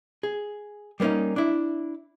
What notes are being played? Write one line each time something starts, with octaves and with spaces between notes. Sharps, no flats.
G#4
G3 A#3 B3 C#4 D#4
D4 E4